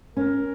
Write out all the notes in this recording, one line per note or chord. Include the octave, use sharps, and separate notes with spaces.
C#4 A#4